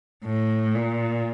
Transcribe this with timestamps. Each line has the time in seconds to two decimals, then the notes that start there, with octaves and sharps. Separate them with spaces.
0.25 A2
0.76 A#2